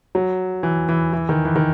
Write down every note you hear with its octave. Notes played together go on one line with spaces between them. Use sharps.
F#3
E3
E3
E3
D#3
E3
D#3